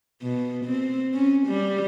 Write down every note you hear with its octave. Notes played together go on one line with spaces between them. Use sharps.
B2
C4
C#4
G3